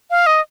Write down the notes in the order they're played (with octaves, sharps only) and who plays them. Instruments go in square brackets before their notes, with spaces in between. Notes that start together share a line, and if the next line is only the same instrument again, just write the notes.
[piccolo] F5
D#5